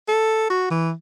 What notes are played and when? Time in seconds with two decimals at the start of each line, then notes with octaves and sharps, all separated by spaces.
0.08 A4
0.50 F#4
0.71 E3